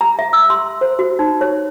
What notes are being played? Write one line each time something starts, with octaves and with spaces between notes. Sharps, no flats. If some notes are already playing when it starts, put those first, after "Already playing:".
A#5
E5
E6
C6
C5
F#4
D#4
C#5